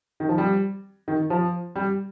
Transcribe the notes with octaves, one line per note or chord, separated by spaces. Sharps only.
D#3
F3
G3
D#3
F3
G3